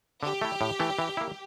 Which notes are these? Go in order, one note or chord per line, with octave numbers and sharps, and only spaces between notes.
D3 G4
A3 E4
A2
E3 A3 E4
E3
A#3 E4